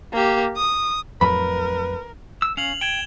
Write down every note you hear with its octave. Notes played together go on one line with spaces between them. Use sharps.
A#3 G4
D#6
F2 A2 F#3 A#4 B4 B5
E6
C#4 F5 F7 F#7
G5 G#6 E7 G7